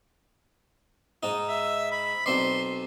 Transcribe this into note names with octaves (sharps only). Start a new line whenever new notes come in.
G#2 D#4
E5
B5
B1 C4 D5 C6